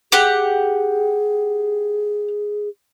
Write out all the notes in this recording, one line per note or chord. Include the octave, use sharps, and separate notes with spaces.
G4 G#4 F#5